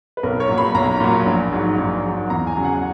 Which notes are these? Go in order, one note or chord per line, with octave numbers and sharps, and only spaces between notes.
B4
B1 A#4
C#5
A#2 F#3
B5
B1 A#5
A#2 F#3
A#1
G#2 F#3
A#1
G#2 F#3
E2 A#5
G#5
C#3 F#3
F#5